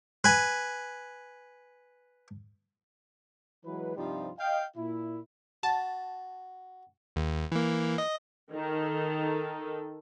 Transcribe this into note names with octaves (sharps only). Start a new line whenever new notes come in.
B4 G#5
E3 F#3 G#3 B4
G2 C3 F3 G3 D#4 F4
D#5 F5 G5
A#2 E4
F#4 A5
D#2
E3 A#3
D#5
D#3 A4